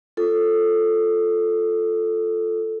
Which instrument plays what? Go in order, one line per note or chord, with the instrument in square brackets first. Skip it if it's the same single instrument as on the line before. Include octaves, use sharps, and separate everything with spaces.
[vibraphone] F4 A4